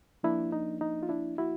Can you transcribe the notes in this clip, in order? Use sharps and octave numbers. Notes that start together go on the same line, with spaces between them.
F3 A#3 D4 E4
D#4
D#4
F4
D4 E4
E4 F#4